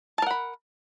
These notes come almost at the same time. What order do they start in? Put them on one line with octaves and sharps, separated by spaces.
A5 A#4 F#5 B5